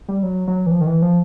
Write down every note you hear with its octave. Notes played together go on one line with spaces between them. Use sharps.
G3
F#3
F#3
E3
F3
D#3
E3
F3